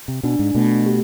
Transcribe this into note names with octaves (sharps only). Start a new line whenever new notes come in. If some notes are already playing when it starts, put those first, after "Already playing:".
C3
B2 D4
G#2
B2 A3
G4